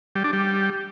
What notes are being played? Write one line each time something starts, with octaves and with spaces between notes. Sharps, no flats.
G3
D4
G3